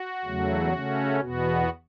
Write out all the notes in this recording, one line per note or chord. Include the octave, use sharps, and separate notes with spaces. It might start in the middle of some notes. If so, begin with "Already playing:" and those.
Already playing: F#4
E2 C#3 F#3 A3
C#3 A3 C#4
E2 B2 B3 F#4